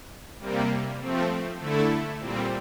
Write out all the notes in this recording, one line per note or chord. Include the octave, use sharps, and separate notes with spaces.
C3 G3 A#3
F3 A3 C4
D3 A3 E4 A4
A#2 G3 C4